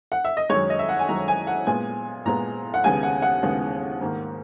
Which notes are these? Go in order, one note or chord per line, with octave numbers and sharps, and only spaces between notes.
F#5
E5
D#5
F#2 D#3 G#3 C#5
D#5
E5
F#5
G#5
F#2 D#3 G#3 A#5
G#5
F#5
A#2 G#3 B3 G#5
A#2 G#3 B3 A#5
F#5
D#2 C#3 G#3 B3 G#5
F#5
F#5
D#2 C#3 G#3 B3
G#2 D#3 A#3